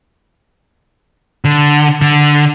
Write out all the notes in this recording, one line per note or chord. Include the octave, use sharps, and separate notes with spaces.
D3
D3